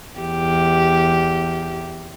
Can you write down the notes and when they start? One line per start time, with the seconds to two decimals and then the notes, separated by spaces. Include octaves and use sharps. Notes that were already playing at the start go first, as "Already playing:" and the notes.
0.20 E2 G4